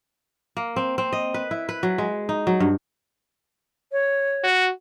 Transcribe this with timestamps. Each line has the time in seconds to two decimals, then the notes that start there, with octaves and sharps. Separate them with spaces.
0.57 A#3
0.76 C4
0.98 C4
1.13 D#5
1.34 B4
1.51 E4
1.69 B4
1.83 F#3
1.98 G#3
2.29 D#4
2.47 F#3
2.60 G2
3.92 C#5
4.44 F#4